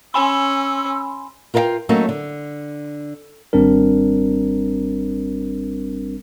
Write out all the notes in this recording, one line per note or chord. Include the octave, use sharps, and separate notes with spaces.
C#4 G#5 B5 C6 E6
F4 A#4 B4 E5 F5 G5
F#3 A3 A#3 C#4 D#4
D3
G#1 G3 C4 D4 A#4